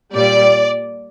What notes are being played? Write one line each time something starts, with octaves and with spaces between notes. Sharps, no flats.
A#2 G3 D5